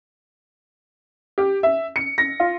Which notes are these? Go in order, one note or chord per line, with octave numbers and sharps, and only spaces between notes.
G4
E5
C#7
A#6
F4